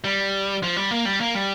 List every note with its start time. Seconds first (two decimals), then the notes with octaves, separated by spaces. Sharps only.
0.04 G3
0.63 F3
0.77 G3
0.91 A#3
1.05 G3
1.21 A#3
1.35 G3